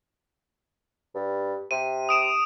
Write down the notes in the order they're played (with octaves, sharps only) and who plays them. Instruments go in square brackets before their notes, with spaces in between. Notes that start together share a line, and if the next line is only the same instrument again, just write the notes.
[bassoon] G2
[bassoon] C3 [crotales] D#7
[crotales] D#6 D7 E7